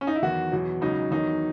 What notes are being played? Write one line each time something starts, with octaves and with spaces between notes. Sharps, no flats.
C#4
D#4
E4
E2 D#3 F#3 F#4
E2 B2 F#3
C#2 C#3 F#3 D#4
E2 D#3 F#3 D#4